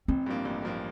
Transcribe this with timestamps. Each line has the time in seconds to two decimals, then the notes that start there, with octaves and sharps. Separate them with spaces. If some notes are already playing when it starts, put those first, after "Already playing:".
0.08 A1 C4
0.26 G2 F3 A#3
0.45 A1
0.63 G2 F3 A#3